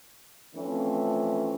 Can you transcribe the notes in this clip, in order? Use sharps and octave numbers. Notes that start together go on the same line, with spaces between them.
E3 F3 A3 C4 C#4